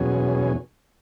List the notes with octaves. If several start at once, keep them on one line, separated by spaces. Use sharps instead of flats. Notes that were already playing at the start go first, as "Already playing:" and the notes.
Already playing: E2 B2 F#3 C#4 G#4